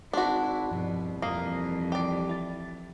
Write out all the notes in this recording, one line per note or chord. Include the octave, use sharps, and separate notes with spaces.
G#1 D4 E4 F#4 A5 C6 C#6
C2 G2 B2 F3
F2 E3 A#3 D#6 A#6 C7
G4 D5
E4 A6